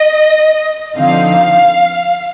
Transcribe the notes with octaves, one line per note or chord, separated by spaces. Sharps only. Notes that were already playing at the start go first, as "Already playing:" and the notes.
Already playing: D#5
D3 F3 C4 D#4 F5